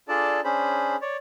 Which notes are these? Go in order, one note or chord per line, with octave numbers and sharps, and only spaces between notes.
D4 F4 G#4 A4 D5 A5
C#4 D4 G#4 C5 B5
C#5 D5